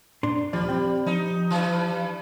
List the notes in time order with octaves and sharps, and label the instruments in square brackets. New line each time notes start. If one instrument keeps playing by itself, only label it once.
[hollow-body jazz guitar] A#2 D4 C6
[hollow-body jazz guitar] D#2 F3 D5 [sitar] G3
[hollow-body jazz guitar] C4 G5
[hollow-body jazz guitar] F3 [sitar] D#4
[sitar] G2 E3